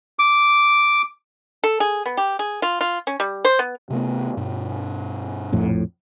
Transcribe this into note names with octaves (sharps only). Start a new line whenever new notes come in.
D6
A4
G#4
B3
G4
G#4
F4
F4
C#4
G3
C5
B3
C3 A3 B3
G2 B2
A#1 F2 A2